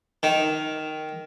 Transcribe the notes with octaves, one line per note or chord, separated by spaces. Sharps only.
D#3